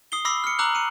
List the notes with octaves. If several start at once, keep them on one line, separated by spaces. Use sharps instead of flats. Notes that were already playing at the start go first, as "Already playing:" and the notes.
D#6 C7 G7
B5 D6 E6 A#6 C7
F6 C#7
A#5 D6 E6 F#6 F#7
C#7 D#7